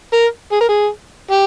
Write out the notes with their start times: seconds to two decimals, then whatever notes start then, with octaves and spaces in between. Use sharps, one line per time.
0.13 A#4
0.52 G#4
0.61 A#4
0.69 G#4
1.31 G4